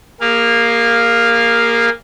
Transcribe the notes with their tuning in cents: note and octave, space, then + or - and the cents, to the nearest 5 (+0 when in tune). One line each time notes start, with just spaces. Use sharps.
A#3 +0 G#4 -35 F5 +0